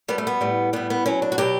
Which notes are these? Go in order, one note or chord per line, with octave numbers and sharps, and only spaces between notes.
B2 G3 B3
A3
B3
A2 G3
A2 G3 B3
B3
B2 F#3 C#4
D4
F#4
B2 F#3 G4